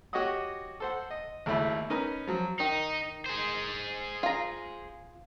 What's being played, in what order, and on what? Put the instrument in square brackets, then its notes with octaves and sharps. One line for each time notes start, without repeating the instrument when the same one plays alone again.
[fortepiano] F#4 G4 C#5 D#5 F#5 D#6
A4 C5 F#5
D#5
G#1 D#2 A3 E4 B5
C#4 D#4 A#4 B4
F3 F#3
[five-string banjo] D#3 [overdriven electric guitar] D#4
[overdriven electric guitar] G#4 C5
[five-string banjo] F4 A#5